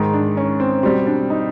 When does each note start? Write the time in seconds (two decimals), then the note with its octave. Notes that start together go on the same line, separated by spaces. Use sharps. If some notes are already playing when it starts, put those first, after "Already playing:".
Already playing: G#2 D#3 G#3
0.13 D4
0.37 C#4
0.60 C4
0.83 B2 G3 C4
1.06 D4
1.30 D#4